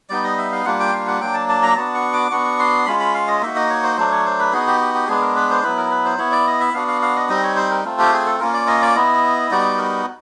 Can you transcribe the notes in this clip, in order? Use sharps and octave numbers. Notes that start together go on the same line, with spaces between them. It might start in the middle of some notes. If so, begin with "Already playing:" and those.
G3 B3 D#4 D5
D#5
E5
F5
G3 A#3 D4 F4 F#5
G5
F5
F#5
F#3 A#3 D4 G5
A5
A5
A#5
B3 D4 F#4 A5
C#6
D6
B3 D4 F#4 C#6
C6
G#3 C#4 F4 B5
B5
F5
D#5
A#3 D#4 F#4 E5
D#5
C#5
C5
F#3 A3 D4 C5
C#5
C5
B4
B3 D#4 F#4 G#4
G4
G4
G4
G#3 B3 D4 G#4
A#4
B4
C5
F#3 B3 E4 B4
A#4
B4
C5
B3 E4 C#5
D5
D#5
E5
B3 D4 F#4 F5
F5
F5
D#5
G3 C4 D#4 D#5
C#5
C5
A#4
A3 C4 F4
G4
G#4
A4
A#3 C#4 F4 A#4
D5
D#5
D5
B3 E4 D#5
G3 B3 D#4 F#4 D5
A#4